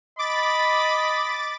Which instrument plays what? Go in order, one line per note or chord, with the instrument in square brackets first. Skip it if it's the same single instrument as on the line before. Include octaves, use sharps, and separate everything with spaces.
[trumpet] D#5 [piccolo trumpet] B5 [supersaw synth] D6 A6